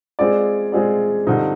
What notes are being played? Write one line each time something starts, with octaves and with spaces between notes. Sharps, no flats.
G#3 C4 F4 G#4 D5
G#3 C4 F4 G#4 D5
G2 D3 F3 C4 D#4